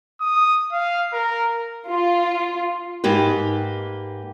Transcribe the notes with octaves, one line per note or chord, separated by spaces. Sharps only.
D#6
F5
A#4
F4
G#2 A#3 G4 B4